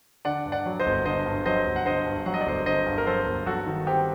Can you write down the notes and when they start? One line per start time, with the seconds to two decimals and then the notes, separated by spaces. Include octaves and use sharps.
0.25 D3 D5 F#5
0.46 G2
0.52 D5 F#5
0.66 F#3
0.80 C5 D#5
0.86 G1
1.05 D3 C5 D#5
1.26 G2
1.46 F#3 C5 D#5
1.66 G1
1.76 F#5
1.86 D3 C5 D#5
2.06 G2
2.26 F#3 F#5
2.34 D#5
2.41 D5
2.46 G1 C5 D#5
2.66 D3 C5 D#5
2.87 G2
2.98 A#4
3.06 F#3 A4 C5
3.27 G1
3.46 F#3 F#4 A4
3.66 D#3
3.87 C4 G4